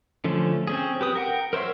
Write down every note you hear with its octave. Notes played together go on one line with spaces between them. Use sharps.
D3 F3 A3 C#4
C4 C#4 G#4
G4 B4 D#6
A#4 F#5 G5
A#4 C5 C#5 E5 C6